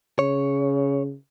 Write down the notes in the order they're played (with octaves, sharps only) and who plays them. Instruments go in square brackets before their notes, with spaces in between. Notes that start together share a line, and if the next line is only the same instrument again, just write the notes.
[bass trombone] C#3 [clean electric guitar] C#5